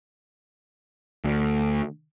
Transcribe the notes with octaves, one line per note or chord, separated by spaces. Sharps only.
D2